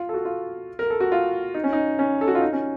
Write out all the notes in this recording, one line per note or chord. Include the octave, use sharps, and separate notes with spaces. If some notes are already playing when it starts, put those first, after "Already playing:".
Already playing: F4
A4
F#4
F4
A#4
A4
F#4
F4
D#4
C#4
D#4
C#4
A4
F#4
F4
D#4
C#4